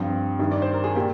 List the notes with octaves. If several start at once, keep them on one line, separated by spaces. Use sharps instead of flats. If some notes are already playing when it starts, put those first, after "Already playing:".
Already playing: G2 F3 C4
G2 D#3 G3
D5
C5
A#4
G#4
A#2 G3 A#3 G4